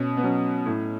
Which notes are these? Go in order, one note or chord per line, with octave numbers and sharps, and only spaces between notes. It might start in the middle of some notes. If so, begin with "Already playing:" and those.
Already playing: B2 C#4
B3
F#3 C#4
A2